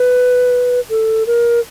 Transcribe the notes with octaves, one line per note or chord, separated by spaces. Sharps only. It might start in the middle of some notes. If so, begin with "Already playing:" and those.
Already playing: B4
A4
A#4